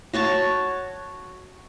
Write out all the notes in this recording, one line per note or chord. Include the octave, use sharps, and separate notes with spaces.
F#4 C#5 A5 C#6